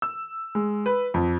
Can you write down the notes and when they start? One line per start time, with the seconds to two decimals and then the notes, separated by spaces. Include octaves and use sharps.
0.02 E6
0.55 G#3
0.86 B4
1.14 F2